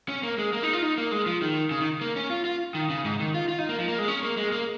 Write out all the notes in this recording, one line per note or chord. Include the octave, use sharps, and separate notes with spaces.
C#4
A#3
G#3
A#3
D#4
F4
D#4
A#3
G#3
F3
D#3
C#3
D#3
A#3
C#4
F4
F4
D#3
C#3
G#2
D#3
F4
F4
D#4
A#3
F3
A#3
G#3
C#4
A#3
G#3
A#3